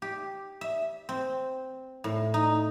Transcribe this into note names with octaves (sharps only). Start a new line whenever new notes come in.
G4
E5
C4
A2
D#4